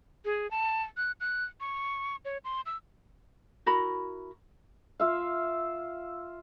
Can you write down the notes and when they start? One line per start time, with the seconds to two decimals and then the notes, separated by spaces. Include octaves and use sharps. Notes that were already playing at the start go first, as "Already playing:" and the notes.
0.25 G#4
0.51 A5
0.97 F#6
1.20 F#6
1.60 C#6
2.25 C#5
2.44 C6
2.66 E6
3.66 E4 F#4 A#4 B5
4.99 F4 E5 F5